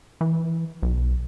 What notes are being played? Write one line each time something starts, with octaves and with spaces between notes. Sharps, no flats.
E3
B1